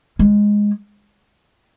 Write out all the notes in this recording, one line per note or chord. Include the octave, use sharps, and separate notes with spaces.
G#3